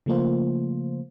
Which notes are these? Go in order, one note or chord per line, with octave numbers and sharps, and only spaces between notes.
C#3 F3 A3 A#3 F4 C5